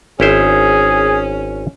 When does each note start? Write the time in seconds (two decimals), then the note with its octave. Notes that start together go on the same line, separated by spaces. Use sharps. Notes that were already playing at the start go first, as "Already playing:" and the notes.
0.20 G#1 C#4 E4 G#4 C5